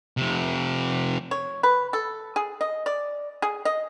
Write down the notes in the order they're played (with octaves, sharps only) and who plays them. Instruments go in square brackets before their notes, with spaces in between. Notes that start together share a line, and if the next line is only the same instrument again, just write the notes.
[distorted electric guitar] F2 C3
[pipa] C#5
B4
A4
G#4
D#5
D5
G#4
D#5